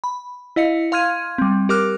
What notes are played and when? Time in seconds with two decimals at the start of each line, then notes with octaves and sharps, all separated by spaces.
0.04 B5
0.56 E4 D#5 F5 C#7
0.92 F5 C6 F6 G#6 D#7
1.38 G3 C4
1.69 G4 A#4 D6 F6 F#6